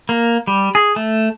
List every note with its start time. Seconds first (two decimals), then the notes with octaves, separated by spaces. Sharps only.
0.09 A#3
0.47 G3
0.75 G#4
0.96 A3